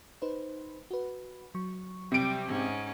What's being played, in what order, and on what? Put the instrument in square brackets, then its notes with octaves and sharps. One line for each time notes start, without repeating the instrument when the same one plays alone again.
[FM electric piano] D#4 B4 C5
F#4 B4
F#3 C#6
[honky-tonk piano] C3 D7 [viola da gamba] G3
[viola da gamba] G#2 C#4